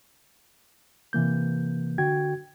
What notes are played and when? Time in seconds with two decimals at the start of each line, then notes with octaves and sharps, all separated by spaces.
1.13 C3 E3 A#3 G6
1.98 D3 F#4 G5 G#6